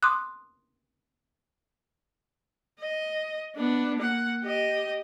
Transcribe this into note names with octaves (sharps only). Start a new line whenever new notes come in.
C6 D6 D#6 F#6
D#5
B3 D4
A#3 F#5
G4 D#5